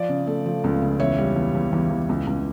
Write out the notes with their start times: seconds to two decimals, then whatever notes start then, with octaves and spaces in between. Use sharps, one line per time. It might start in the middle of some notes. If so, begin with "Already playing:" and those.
Already playing: F3 D5
0.09 C#3
0.27 A3
0.46 F3
0.64 C#2
0.82 C#3
1.00 E2 C#5 E5
1.18 G3
1.36 E2
1.55 E2
1.73 E2
1.90 E2
2.09 C#2
2.27 C#2